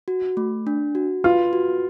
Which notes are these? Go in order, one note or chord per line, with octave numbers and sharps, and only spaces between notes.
F#4
A3
D4
F#4
F4 B4
F#4